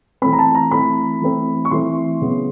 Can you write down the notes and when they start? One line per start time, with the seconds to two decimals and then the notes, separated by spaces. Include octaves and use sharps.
0.22 E3 A3 C4 B5
0.33 A#5
0.39 A5
0.55 A#5
0.71 E3 A3 C4 B5
1.21 E3 A3 C4
1.65 C#6
1.71 E3 A3 C4 C6
2.21 C#3 F#3 B3